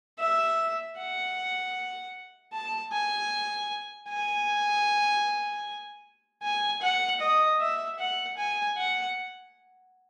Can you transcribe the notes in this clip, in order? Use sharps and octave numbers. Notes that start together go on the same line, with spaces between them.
E5
F#5
A5
G#5
G#5
G#5
F#5
D#5
E5
F#5
G#5
F#5